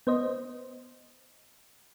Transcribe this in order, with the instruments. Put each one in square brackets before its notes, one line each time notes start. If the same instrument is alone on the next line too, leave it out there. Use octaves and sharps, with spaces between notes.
[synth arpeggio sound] B3 C5 D#5